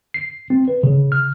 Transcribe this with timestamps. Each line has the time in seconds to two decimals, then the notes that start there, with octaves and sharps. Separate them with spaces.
0.14 C7
0.50 C4
0.68 B4
0.83 C#3
1.12 F6